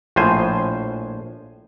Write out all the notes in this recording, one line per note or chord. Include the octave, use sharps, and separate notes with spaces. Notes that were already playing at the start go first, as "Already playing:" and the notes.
A#1 A2 F3 C5 G#5